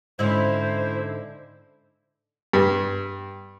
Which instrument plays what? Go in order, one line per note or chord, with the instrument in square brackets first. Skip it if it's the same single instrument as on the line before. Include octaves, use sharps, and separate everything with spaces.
[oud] G#2 D3 C#4 [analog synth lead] E4 [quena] C5
[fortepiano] G2